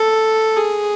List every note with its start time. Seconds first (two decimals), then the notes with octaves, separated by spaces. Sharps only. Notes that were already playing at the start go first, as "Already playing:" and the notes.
Already playing: A4
0.57 G#4